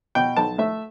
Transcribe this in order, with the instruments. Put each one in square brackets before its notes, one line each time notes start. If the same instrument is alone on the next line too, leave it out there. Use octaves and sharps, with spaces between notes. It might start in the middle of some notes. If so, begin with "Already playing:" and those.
[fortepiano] B2 G5
B1 A5
A3 E5